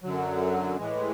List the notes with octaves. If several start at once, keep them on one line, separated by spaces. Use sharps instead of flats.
F#2 D3 F#3
A2 E3 G#3